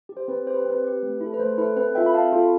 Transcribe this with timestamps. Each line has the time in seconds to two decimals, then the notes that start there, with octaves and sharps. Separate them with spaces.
0.09 G4
0.17 C5
0.28 C4 B4
0.47 G4 C5
0.54 B4
0.65 C4 B4
0.84 G4
1.03 A3
1.21 E4 A4
1.34 B4
1.39 A3 C5
1.58 E4 A4 B4
1.77 C4 B4
1.95 F4 A4 E5 G5
2.06 B5
2.14 C4 F5 A5
2.33 F4 A4